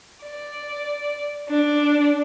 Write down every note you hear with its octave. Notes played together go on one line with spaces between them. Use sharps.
D5
D4